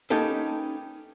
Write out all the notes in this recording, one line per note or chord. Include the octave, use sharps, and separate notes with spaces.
A#3 C#4 D#4 G4 A4 B4